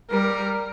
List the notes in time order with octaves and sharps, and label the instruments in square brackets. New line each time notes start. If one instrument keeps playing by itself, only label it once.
[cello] G3 [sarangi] A#4